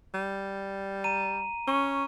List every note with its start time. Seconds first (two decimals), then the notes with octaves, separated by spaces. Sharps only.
0.14 G3
1.04 A#5 D#7
1.68 C#4 C#6